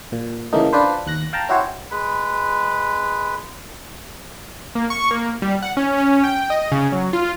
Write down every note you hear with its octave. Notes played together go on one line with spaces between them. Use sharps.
A#2
C#3 E3 A3 A#3 D#4
D4 F4 B4 C5
D#2 F#6 A#6
F5 G5 A5 A#5
C#4 E4 F#4 G4 C5 C#5
G#3 B4 B5
A#3
C#6
A#3
G3
F#5
C#4
C#4
G5
D#5
C#3
F#3
F4